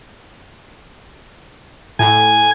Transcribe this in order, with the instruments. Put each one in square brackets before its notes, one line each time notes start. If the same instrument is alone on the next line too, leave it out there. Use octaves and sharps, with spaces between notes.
[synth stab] A2 [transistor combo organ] G#5